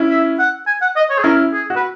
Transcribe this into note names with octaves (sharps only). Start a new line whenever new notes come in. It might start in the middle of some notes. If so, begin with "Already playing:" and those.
Already playing: C#4 E4
E5
F#5
G#5
F#5
D#5
C#5
G#4
C#4 E4 A#4
G#4
F#4
B4